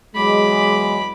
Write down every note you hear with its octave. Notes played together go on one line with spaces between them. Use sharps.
E2 F#3 G#3 B5 D6